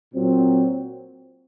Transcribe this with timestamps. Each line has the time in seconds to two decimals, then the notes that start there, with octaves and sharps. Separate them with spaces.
0.13 A#2 F#3 C4